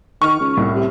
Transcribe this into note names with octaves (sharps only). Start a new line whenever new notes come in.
D#3 C#6 F6
C#2
C2 A2
C3